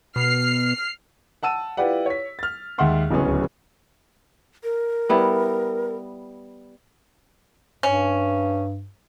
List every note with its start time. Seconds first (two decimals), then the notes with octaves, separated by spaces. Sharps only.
0.16 B2 F6 C7
1.43 F#5 A5 E6 D#7
1.77 E4 F4 G4 B4 D5 F#5
2.06 C#5 B6
2.39 F6 A6
2.78 D#2 G#3 E5 F#5 C6 F6
3.10 D1 C#2 F#3 B3 C#4 G#4
4.64 A#4
5.09 G3 B3 E4
7.83 G2 C#4